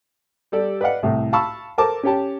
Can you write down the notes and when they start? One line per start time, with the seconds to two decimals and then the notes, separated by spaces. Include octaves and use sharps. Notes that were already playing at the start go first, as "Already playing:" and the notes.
0.52 G3 G4 A4 D5
0.81 B4 D5 D#5 F5 F#5
1.03 C2 A2
1.33 F5 A5 B5 C#6 E6
1.78 A4 A#4 C5 A5 D6
2.03 C#4 G4 C#5 G5 A5